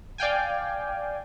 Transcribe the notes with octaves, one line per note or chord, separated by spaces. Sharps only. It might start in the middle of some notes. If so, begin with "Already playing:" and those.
D5 F5 G5 G#5